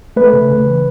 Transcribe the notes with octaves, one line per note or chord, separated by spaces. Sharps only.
A3 B4
C#3
C#3
E3